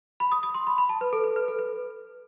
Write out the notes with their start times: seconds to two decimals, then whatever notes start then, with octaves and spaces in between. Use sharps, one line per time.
0.20 B5
0.32 D#6
0.43 D#6
0.54 C6
0.67 B5
0.78 B5
0.89 A5
1.01 B4
1.13 A4
1.24 B4
1.36 B4
1.48 A4
1.59 B4